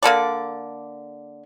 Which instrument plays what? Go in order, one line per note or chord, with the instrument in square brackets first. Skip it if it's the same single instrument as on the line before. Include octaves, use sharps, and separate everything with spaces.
[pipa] D3 A#3 A4 D5